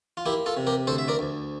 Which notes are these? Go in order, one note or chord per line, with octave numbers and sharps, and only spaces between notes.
F4
A#3 E4 G4
F4 A4
C3
G4 A#4
D2 A4 C5
E5
A#4 D5
D2